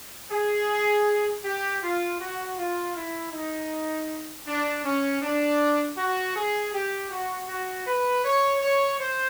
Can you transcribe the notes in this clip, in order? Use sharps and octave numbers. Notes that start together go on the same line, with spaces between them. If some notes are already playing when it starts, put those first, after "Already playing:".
G#4
G4
F4
F#4
F4
E4
D#4
D4
C#4
D4
F#4
G#4
G4
F#4
F#4
B4
C#5
C#5
C5